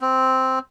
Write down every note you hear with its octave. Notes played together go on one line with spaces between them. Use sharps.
C4